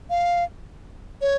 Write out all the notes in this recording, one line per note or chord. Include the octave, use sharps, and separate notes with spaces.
F5
C#5